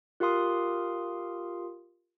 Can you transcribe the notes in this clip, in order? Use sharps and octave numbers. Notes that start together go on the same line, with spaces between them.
F4 G4 A#4 F5 C6 D#6